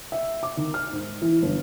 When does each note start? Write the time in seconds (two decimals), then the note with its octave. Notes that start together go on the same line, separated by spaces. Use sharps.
0.12 E5
0.43 D6
0.57 D#3
0.74 F6
0.92 G#2
1.22 E3
1.42 G1